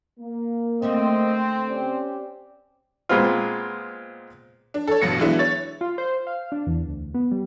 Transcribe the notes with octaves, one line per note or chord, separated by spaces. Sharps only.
A#3
D3 A3 C4 D#5 E5
C#4 G4 C5 D5
A#2 G#3 B3 C4 F4
D4
A4 C#5
A1 G2 B2 F#3 A#6 C#7
E3 F#3 G#3 B3 D4 E4
C#5 A6
F4
C5
F5
D4
E2
D2
B3
G3